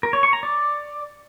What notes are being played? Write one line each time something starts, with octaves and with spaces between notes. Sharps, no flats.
A#4
C#5
C#6
A#5
D5